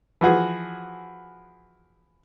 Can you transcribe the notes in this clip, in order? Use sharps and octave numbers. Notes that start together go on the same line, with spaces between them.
E3 F3 F#4 G#4